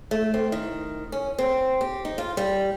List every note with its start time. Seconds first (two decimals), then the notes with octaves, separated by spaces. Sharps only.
0.11 A3
0.34 C4
0.52 D#3
1.12 C#4
1.39 C4
1.81 G4
2.05 D#4
2.18 F4
2.37 G3